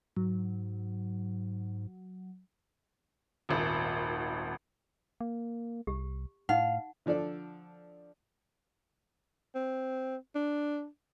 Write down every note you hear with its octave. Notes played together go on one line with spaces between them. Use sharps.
G#2 F#3
D#1 G#1
A#3
C2 G4
A2 D#4 F5 F#5
D3 F3 D4 A4 D5
C4
D4